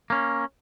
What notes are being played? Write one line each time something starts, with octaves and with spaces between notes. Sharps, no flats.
A#3 C#4